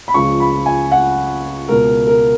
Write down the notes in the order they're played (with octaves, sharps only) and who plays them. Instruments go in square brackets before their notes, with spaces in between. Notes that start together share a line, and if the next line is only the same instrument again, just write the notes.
[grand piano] B5
C#2 C#3 F3 C#6
B5
G#5
F#5
C#2 B2 A#4
A#4